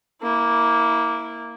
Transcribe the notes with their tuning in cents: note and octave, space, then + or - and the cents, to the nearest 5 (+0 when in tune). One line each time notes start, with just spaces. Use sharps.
A#3 +0 E4 -20